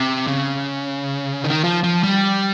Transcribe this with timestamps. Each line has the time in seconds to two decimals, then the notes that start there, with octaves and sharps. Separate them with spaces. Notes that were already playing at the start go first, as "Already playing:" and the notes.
Already playing: C3
0.28 C#3
1.44 D#3
1.64 F3
1.83 F3
2.03 G3